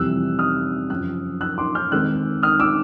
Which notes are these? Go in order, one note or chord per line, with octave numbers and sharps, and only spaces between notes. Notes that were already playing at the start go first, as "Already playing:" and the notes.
Already playing: F2 C3 E3 G3 E6 F#6
D#6 F6
F#2 C#3 F3 E6 F#6
E6 F#6
C6 D6
F6 G6
D#3 G#3 C4 D#4 E6 F#6
D#6 F6
D6 E6